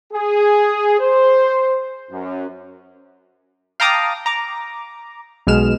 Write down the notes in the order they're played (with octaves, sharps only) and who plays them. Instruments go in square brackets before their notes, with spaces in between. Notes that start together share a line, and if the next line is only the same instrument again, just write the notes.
[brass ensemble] G#4
C5
F#2
[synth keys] F5 G5 A5 A#5 D6 D#6
A#5 D6
B1 B2 G#3 F6 E7